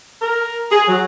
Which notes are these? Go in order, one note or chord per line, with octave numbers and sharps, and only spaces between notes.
A#4
G#4
F#3